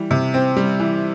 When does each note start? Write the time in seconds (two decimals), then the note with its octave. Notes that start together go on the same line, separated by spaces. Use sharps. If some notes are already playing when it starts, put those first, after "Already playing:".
Already playing: E3 G3
0.11 C3
0.34 C4
0.56 G3
0.79 E3